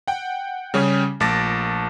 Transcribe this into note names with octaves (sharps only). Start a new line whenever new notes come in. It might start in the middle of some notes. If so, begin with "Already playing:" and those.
F#5 G5
C#3 G3 C#4 G4 G#4
A#1 A3 A5 D6 A6 A#6